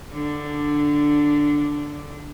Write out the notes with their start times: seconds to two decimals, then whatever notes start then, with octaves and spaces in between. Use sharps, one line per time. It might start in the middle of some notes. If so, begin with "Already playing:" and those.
0.12 D3 D4